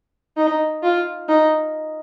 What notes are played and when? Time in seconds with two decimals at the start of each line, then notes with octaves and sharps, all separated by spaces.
0.37 D#4
0.83 F4
1.29 D#4